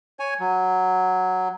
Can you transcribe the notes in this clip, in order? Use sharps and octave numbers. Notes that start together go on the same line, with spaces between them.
C#5 G#5
F#3